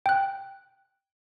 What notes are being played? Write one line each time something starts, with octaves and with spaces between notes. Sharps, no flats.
G5 F#6